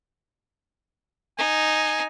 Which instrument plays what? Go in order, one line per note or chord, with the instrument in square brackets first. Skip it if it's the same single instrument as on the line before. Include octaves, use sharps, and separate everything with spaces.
[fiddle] D#4 [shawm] G#5